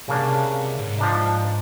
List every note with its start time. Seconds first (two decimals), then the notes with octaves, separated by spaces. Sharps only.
0.08 C2 C#3 A#3 D4
0.79 G#2
0.98 F3 D4 D#4